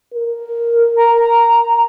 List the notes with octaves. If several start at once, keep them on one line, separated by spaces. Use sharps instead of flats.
A#4
A#5